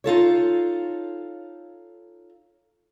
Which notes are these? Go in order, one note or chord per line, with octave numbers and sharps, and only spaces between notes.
D#4 F4 A4 C#5